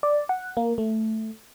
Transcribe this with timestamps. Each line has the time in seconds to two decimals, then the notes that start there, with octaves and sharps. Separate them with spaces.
0.03 D5
0.29 F#5
0.57 A#3
0.78 A3